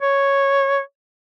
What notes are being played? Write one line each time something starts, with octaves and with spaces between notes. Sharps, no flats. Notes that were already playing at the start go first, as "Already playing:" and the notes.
C#5